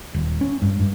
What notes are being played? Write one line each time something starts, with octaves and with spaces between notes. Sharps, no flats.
D#1
C#4
G2
G2